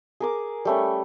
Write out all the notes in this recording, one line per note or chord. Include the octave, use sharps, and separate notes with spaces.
G#4 A#4 D6
G3 A3 C#4